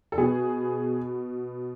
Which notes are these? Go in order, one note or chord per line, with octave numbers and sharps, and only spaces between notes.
A4
B2 B3 G#4